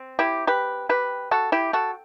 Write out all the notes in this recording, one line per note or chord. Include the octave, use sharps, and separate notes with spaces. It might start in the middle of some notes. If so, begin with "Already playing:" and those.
Already playing: C4
E4 G4
G4 B4
G4 B4
F#4 A4
E4 G4
F#4 A4